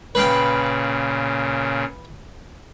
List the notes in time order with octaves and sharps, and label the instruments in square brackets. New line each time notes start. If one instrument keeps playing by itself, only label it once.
[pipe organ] A#2 C#3 [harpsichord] B4 F5 G5